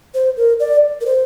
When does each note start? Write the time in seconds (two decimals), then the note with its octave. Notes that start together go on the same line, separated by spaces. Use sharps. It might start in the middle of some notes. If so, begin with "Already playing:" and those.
0.14 C5
0.37 A#4
0.60 D5
1.01 A#4
1.06 C5